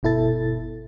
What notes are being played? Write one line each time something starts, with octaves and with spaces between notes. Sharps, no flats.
G1 B2 E4 A4 A6